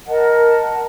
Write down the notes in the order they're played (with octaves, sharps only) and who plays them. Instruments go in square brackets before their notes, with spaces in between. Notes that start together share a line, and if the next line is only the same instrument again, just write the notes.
[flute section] A#4 D#5 F#5 A5